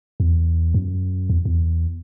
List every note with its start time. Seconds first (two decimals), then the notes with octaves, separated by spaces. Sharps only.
0.20 E2
0.74 F#2
1.30 E2
1.45 E2